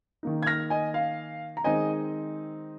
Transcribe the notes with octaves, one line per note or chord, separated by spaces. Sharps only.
D#3 A#3 D#4
G#6
F6 A#6
D#5 G#5
F5
A#5
D#3 G#3 C4 D#4 D#5 G#5